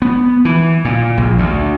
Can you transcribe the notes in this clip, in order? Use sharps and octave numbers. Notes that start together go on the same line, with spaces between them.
B3
E3
A#2
A#1
D2